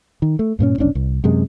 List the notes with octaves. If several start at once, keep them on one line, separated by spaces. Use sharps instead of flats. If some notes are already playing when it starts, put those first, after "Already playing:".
D#3
A3
G2 A#2 B3 C#4
F1 B1 C#4 D4
C2
F#2 C3 G#3